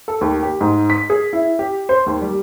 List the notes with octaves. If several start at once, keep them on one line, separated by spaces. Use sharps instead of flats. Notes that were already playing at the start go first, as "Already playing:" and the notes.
A4
D#2
G4
G#2
B6
G#4
E4
G4
C5
D#2
G3